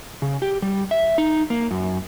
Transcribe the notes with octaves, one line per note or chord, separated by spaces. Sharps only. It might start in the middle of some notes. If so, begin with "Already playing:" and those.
C#3
G4
G3
E5
D#4
A#3
F#2